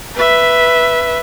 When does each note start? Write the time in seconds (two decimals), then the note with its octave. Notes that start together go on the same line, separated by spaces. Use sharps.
0.15 B4 E5